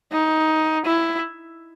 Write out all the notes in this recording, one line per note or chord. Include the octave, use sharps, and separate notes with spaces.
D#4
E4